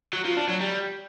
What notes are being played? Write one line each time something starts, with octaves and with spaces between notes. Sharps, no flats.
F#3
F3
D4
F#3
G3